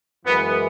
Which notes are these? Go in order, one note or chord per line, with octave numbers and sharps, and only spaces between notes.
F#2 E3 G#3 B3